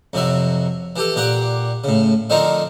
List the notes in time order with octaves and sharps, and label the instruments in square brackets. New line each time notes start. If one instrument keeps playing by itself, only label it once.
[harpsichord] F2 C3 F#3 E5
E3 G4 A4
A#2 G4 D5 F#5 D6
A2 C#3
D3 D#3 F3 C4 D#4 F4